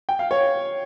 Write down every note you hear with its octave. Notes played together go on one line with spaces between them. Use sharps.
G5
F5
C#5